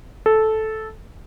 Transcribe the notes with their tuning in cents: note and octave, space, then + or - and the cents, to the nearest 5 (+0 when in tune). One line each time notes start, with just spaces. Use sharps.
A4 -10